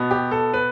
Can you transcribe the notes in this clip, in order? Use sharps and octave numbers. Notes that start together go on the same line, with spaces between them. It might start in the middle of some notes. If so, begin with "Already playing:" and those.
Already playing: B2 B3
G4
A4
B4